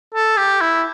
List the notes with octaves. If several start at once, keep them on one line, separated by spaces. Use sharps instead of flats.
A4
G4
E4